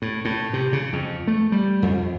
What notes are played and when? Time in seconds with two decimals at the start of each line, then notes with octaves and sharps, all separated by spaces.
0.02 A2
0.25 A2
0.53 C3
0.73 C#3
0.93 F2
1.27 A3
1.52 G3
1.82 F2